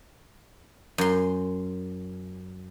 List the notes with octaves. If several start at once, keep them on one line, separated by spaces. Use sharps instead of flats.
F#2 C6